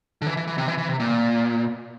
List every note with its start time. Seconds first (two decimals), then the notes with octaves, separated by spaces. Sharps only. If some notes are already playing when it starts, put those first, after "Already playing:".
0.22 D3
0.27 E3
0.37 E3
0.47 E3
0.58 C3
0.68 E3
0.78 E3
0.89 C3
1.00 A#2